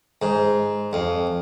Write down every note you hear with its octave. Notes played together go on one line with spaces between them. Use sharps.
G#2
F2